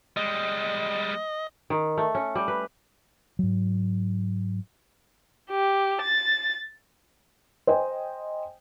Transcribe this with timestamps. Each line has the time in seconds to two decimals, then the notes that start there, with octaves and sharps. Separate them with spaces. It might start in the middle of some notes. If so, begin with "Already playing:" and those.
0.17 G3 G#3 D#5
1.70 D#3
1.98 A3
2.15 C#4
2.35 G3
2.48 B4
3.39 G#2 F#3
5.51 G4
6.01 A6
7.67 C5 D#5 G5 G#5